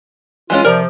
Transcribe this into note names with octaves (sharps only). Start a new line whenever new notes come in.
E3 G#3 C#4 F4
C3 F3 A#4 D5 A#5